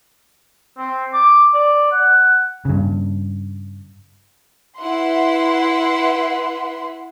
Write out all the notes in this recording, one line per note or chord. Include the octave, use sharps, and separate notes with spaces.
C4
D6
D5
F#5
G2 C#3
E4 B4 E5 F#5 C6